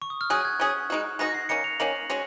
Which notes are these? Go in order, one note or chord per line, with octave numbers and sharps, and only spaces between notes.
C#6
D#6
F6
F#3 C#4 G#4 F#6
G#6
F#3 C#4 G#4
G#3 D#4 F#4
G#3 D#4 F#4 A#6
C7
D#3 A#3 C#4 C#7
F7
D#3 A#3 C#4 F#7
G#3 C#4 F#4